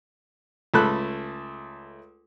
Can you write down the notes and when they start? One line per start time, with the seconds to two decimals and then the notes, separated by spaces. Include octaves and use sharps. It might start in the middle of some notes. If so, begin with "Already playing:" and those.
0.74 C#2 A3 A4 B5 F#6